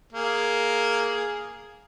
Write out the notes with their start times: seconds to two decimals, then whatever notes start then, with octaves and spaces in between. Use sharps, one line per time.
0.13 A#3 G#4